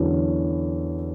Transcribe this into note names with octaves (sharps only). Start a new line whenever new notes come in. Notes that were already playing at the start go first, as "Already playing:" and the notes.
Already playing: E2 D3 F#3 C#4 E4